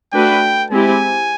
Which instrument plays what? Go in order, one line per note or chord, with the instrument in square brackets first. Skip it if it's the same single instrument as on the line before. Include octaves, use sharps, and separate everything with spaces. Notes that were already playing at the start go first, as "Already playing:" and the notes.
[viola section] A3 D4 F#4 B4 [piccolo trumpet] G5
[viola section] G#3 C4 E4 G4 [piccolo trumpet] G#5